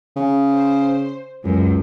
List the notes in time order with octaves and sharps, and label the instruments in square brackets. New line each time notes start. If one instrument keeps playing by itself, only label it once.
[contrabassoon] C#3
[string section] C5
[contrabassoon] C#2 [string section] F#2